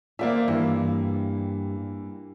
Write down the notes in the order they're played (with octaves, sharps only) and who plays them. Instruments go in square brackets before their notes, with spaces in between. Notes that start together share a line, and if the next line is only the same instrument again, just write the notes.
[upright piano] A#3 D5 E5 [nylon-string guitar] F4 C5
[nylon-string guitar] G2 [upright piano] E3 A#3